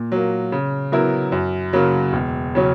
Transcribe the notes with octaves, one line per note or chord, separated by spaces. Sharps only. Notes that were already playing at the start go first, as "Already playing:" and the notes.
Already playing: A#2
F#3 A#3
C#3
F#3 B3 E4 A#4
F#2
C#3 F#3 A#3
E1
C#3 F#3 C#4